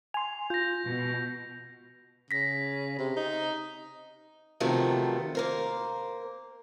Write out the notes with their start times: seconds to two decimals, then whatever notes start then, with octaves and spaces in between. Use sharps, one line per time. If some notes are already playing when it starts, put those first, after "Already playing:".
0.14 G#5 C6 F7
0.50 F4 G6 A#6
0.87 B2
2.31 C#3 A#6 B6
2.98 C3
3.16 D#4
4.60 C3 D#3 F3 F#3 A3 B3
5.35 A#3 A#4 C5